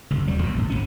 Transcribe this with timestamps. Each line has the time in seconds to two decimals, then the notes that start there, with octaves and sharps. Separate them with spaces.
0.10 F#1 C#2
0.27 E1 D#2 F#3 G3
0.42 C#2 B2
0.54 A1 A2
0.70 F1 C2 C#4